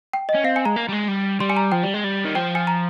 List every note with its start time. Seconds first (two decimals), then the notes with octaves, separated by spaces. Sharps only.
0.13 G5
0.29 D#5
0.35 C#4
0.44 C4 F5
0.56 G#5
0.65 G#3 A#5
0.76 A#3
0.88 G3
0.92 G#3
1.08 G3
1.40 G3 C6
1.50 G#5
1.57 A#5
1.72 F3 G5
1.83 G3
1.94 G#3
2.04 G3
2.25 D#3
2.35 F3 G5
2.55 G#5
2.67 A#5